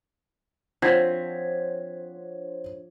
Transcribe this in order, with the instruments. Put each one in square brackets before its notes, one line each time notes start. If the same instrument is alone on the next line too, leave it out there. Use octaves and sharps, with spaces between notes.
[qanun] F3 [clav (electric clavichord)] C4 [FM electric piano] D4 C5 C#5 [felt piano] F#5 G#6 B6